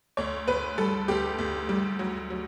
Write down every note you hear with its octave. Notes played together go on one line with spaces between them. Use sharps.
D2 C#5
D2 B4
G3 A4
D2 G4
D2
G3
F#3
F#3